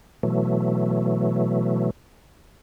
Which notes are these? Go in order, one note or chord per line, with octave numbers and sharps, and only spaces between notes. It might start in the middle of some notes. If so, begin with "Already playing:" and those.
B2 E3 F#3 A3